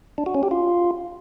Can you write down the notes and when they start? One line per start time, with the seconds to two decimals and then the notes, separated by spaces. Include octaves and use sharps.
0.18 D4
0.26 F#4
0.35 C#4
0.43 G4
0.51 F4